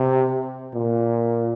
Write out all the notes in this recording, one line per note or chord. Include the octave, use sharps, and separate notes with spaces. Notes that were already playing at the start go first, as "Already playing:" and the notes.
Already playing: C3
A#2